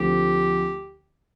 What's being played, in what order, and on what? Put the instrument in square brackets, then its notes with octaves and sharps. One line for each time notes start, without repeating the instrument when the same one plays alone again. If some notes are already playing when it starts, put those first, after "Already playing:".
Already playing: [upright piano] D2 D3 F3 C4 [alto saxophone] G4